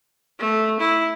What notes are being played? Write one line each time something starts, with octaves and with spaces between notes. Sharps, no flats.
A3
E4